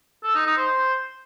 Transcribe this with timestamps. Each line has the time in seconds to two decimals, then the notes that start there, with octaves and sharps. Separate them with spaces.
0.24 A4
0.35 D#4
0.46 D#4
0.57 C5